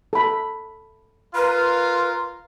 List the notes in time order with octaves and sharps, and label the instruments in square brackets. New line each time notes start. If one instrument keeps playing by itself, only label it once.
[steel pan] A4 B5
[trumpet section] F4 A#4 F5 [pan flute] B4